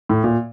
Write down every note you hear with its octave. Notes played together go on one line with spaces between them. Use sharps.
A2
A#2